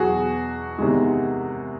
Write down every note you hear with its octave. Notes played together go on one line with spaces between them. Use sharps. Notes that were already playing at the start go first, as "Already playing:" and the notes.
Already playing: E2 B2 F#3 F#4 G#4
E2 C3 D#3 G#3